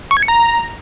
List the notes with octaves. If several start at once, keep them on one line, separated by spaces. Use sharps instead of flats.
C#6
G#6
C#7
A#5